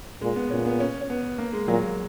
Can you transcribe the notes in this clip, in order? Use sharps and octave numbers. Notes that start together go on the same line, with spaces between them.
A#2 G#3
B3
A#2 C#4
B3
C#4
C#4
B3
A#3
G#3
A#2 F#3